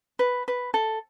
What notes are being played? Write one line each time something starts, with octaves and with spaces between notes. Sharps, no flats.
B4
B4
A4